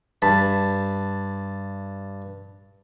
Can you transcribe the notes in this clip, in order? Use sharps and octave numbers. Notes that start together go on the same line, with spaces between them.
G2 A5 B5